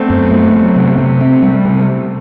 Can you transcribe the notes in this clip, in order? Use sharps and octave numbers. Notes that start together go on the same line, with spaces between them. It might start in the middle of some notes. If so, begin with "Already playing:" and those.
Already playing: A3 B3 C4 D4
F#2
A3
F#3
C3
C3
C4
G3
C3